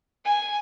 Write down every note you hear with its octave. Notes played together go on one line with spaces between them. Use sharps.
G#5